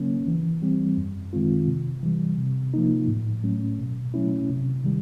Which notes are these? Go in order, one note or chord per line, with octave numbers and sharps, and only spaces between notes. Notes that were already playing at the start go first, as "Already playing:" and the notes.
Already playing: C#3 F#3 A#3 C#4
E3
G3 C4
F#2
D#3 G#3 C4 F4
C3
E3 G3
C3
F3 A#3 D#4
A2
F#3 A3 C#4
B2
F#3 A3 C#4 E4
C3
D#3 G3